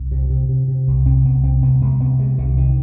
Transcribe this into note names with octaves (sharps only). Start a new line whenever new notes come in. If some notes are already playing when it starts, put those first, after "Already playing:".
Already playing: C2
C3
C3
C3
C3
C2
C3 C4
C2 B3
C3 C4
C2 B3
C2 G#3
C3 B3
C3 G#3
C2 D3
C3 D#3